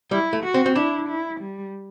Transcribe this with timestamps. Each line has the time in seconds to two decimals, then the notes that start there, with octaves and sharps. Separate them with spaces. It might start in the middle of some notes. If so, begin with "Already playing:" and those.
0.11 G3 E4
0.33 A3
0.43 F#4
0.54 C4
0.66 C4
0.76 D4 E4
1.08 E4
1.40 G3